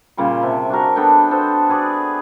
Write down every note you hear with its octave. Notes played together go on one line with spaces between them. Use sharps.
A#2 C#3 G3 C6
C3 E5 A5
D4 F#4 A#4
B3 D4 A4 G5
B3 A4 C5
F#4 G#4 B4 D5